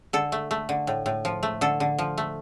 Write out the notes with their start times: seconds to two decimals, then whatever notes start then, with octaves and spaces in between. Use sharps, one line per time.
0.13 D3 A4
0.32 A3
0.51 A3
0.69 D3
0.87 A2
1.06 A2
1.25 F3
1.43 A3
1.61 D3 A4
1.80 D3
1.98 F3
2.18 A3